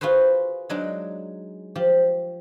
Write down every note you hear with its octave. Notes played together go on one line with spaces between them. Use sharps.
F4 F#4 G#4 B4 C5
F#3 G#3 D4 D#4
F3 G4